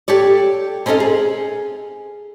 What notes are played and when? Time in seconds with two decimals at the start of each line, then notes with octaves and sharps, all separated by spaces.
0.08 G4 A4 C#5 D5
0.86 C4 C#4 D#4 A4 D#5 F5
1.00 G#4